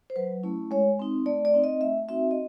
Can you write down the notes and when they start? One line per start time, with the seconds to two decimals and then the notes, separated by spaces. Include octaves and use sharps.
0.10 C5
0.16 F#3 B4
0.43 A3 C#4 E4
0.71 G#3 C#5
0.99 C4 D#4
1.26 A3 D5
1.45 D5
1.54 C4 D#4
1.64 D#5
1.81 A3 E5
2.09 C4 D#4 F#4 E5
2.31 D#5